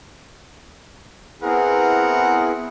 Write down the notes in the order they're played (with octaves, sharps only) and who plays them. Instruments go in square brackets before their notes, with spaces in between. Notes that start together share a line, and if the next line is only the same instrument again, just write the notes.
[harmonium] B3 E4 G#4 [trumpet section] C4 A#4 F#5